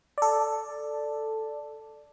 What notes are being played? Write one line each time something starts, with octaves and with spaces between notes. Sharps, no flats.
A4 D5